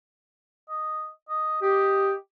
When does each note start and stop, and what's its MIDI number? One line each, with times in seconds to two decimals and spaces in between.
0.69 1.10 75
1.29 1.62 75
1.62 2.13 67
1.62 2.13 75